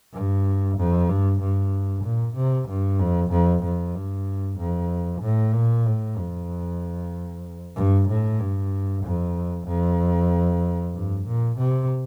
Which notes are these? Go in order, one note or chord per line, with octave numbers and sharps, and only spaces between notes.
G2
F2
G2
G2
A#2
C3
G2
F2
F2
F2
G2
F2
A2
A#2
A2
F2
G2
A2
G2
F2
F2
G2
A#2
C3